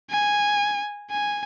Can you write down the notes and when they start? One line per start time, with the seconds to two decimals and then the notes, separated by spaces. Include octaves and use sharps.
0.10 G#5
1.10 G#5